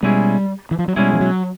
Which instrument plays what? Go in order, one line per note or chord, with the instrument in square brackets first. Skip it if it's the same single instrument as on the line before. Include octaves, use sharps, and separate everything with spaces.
[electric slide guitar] B2 G#3 C#4 E4 G#4 [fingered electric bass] G3
[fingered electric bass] E3
F3
F#3
[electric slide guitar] B2 G#3 C#4 E4 G#4 [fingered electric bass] G3
[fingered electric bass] F3
F#3